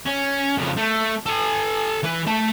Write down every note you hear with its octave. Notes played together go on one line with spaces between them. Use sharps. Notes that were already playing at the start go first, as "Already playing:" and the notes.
C#4
F2 C#3
A3
A4 G#5
E3 B4
A3 A5